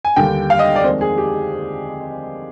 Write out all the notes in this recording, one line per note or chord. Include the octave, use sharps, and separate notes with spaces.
G#5
D#2 D3 G3 G5
F5
D#5
D5
F2 D#3 G#3 C5
G#4
G4